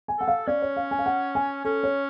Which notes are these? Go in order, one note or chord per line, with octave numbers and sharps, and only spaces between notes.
G#5
A4 F#5
F5
C#4 D5
C#5
F5
G#5
F5
F#5
G#5
C#4 A4
C#5